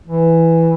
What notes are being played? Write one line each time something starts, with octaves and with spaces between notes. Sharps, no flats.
E3